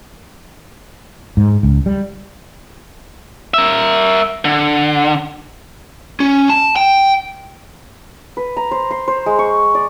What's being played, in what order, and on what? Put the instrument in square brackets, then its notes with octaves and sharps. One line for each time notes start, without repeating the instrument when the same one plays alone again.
[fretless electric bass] G#2
C#2
G3
[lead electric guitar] A#4 E5
D3
C#4
A5
G5
[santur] B4
A#5
C5
C6
C5
G#3
C#6
D5